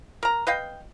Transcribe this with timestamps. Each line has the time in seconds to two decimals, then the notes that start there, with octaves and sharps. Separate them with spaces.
0.23 A#4 A#5
0.47 B4 D#5 F5 G5